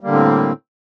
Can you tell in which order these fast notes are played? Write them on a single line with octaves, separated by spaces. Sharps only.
G3 A#3 D3 A2 C4